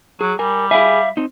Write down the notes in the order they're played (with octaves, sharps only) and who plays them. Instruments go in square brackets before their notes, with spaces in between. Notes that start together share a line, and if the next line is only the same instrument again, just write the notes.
[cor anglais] F#3 [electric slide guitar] G#4
[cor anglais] G3 [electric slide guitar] A#4 G#5
[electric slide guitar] G#4 G#5 [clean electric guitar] E5 F5 B5
[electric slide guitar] C4 D#4